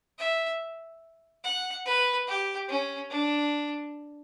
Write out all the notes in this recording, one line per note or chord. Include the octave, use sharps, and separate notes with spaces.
E5
F#5
B4
G4
C#4
D4